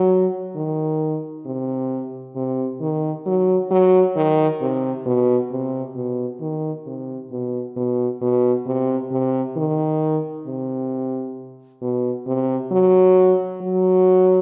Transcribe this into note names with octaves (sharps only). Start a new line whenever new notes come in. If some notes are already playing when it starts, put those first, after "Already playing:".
Already playing: F#3
D#3
C3
C3
D#3
F#3
F#3
D#3
C3
B2
C3
B2
D#3
C3
B2
B2
B2
C3
C3
D#3
C3
B2
C3
F#3
F#3